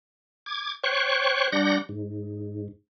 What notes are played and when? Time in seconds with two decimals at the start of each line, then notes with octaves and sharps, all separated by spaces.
0.46 D6 G#6
0.84 C5 C#5 G5 C#6 F#6
1.52 G3 D4 F#5 G6 A#6
1.89 G#2